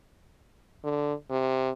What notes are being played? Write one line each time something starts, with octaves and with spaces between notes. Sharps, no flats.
D3
C3